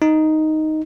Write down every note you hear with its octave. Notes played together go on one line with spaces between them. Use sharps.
D#4